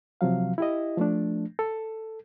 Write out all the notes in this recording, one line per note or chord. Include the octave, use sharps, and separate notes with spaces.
C3 F3 F#3 F5
E4 G4 D#5
F3 A3 D4
A4